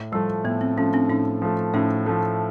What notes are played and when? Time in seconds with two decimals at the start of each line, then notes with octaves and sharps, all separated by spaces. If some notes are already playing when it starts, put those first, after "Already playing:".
Already playing: A2
0.12 F3 G3 A3
0.44 A2 B3
0.61 C4
0.77 F3 A3 C#4
0.93 C4 D4
1.09 A2 C#4 D#4
1.42 F3 A3
1.73 A2 C#4 D#4
2.06 F3 A3